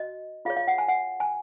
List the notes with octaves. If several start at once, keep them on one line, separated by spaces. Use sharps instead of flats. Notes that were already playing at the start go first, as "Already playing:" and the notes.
Already playing: F#4 D#5
F4 G#4 C#5 F5
F5
F#5
G#5
F#5
G#5